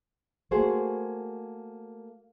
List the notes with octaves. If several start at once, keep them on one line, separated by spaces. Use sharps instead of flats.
A3 A#3 F#4 G#4 C5